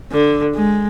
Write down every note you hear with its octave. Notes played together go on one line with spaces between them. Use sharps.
D3
G#3